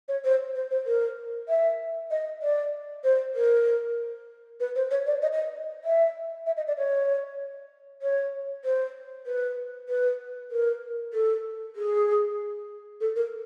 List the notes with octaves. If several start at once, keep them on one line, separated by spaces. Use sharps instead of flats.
C#5
C5
C5
C5
A#4
E5
D#5
D5
C5
A#4
B4
C5
C#5
D5
D#5
D#5
E5
E5
D#5
D5
C#5
C#5
C5
B4
B4
A#4
A4
G#4
A4
A#4